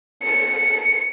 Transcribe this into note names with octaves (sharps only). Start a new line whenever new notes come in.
C#7